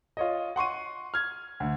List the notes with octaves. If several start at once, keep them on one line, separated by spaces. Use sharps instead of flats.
F4 C#5 D#5
F#5 C6 C#6 D#7
F6 G#6
D2